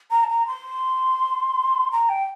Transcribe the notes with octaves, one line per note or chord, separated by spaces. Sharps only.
A#5
A5
A#5
C6
A#5
G5